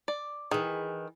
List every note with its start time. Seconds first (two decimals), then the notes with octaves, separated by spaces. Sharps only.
0.08 D5
0.51 D#3 E3 G#4